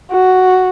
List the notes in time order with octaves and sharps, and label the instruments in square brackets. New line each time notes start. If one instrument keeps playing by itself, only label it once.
[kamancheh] F#4